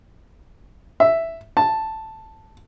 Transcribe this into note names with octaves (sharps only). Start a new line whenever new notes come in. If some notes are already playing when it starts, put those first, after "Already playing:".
E5
A5